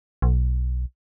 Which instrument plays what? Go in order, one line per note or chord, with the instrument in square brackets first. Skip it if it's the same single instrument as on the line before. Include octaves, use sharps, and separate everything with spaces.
[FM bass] B1